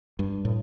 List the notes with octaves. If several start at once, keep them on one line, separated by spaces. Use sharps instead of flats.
G2
A2